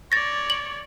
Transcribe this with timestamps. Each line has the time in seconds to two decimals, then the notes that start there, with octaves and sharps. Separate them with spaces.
0.12 C#5 D5 A6 A#6
0.50 F#7